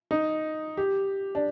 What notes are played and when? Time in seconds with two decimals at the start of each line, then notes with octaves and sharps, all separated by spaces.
0.11 D#4
0.77 G4
1.35 D4